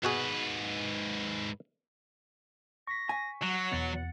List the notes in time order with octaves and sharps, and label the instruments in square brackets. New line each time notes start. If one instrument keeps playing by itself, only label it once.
[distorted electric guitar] G#2 B4 [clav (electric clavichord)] B2 F#4 G#4
[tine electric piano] C#6 B6 [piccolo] A#6
[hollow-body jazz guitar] G#5
[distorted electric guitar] F#3 [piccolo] F#5
[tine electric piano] E2 A6 C#7 [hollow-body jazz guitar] B2